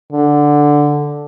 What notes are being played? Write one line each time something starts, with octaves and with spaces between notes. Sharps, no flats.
D3